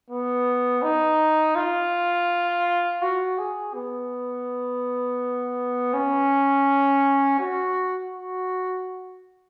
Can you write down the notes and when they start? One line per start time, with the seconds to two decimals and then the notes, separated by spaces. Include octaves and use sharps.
0.10 B3
0.82 D#4
1.56 F4
3.02 F#4
3.38 G#4
3.74 B3
5.94 C#4
7.40 F#4
8.13 F#4